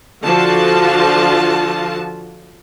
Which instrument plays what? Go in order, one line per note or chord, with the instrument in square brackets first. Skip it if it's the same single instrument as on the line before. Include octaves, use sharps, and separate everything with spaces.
[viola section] D3 F3 F4 F#4 A5